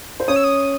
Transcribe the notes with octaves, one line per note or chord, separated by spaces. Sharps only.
C5
C#4 C#5 D#6
E6
D#6